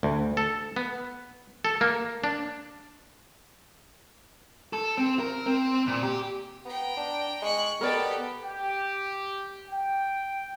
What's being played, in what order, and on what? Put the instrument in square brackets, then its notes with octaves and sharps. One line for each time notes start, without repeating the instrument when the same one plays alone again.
[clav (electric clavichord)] D2
A4
B3
A4
A#3
D4
[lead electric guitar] A4
C4
A#4
C4
A#2
G4
[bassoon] B3 [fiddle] G5 A#5
[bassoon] D4
[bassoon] G#3 [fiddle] C#6 F#6
[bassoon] B2 [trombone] B3 [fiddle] G4 A4 [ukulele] A#4 D5
[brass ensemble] G4
G5